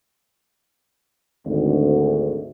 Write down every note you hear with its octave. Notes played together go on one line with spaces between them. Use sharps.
G#1 D2